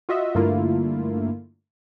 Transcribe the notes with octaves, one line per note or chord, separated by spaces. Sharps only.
F4 F#4 D#5 E5
G2 D3 A3 A#3 E4 F4